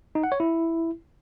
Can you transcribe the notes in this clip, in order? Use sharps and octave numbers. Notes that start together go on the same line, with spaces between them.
D#4
F#5
C#5
E4